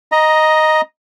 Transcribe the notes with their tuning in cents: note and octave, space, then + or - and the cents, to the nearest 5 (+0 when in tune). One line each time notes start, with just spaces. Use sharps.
D#5 +0 A#5 +15